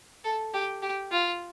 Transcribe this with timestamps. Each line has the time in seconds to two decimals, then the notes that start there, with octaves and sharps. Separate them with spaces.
0.24 A4
0.54 G4
0.82 G4
1.11 F4